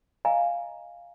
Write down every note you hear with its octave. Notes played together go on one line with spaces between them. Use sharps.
D#5 F5 G#5 A#5